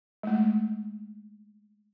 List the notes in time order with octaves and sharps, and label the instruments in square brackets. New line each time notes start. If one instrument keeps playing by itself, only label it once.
[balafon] G#3 A3